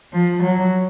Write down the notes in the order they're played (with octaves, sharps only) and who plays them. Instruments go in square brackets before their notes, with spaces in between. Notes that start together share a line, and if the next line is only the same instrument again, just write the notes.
[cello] F3
F#3